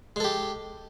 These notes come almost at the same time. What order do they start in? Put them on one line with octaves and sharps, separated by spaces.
G#3 A4 G4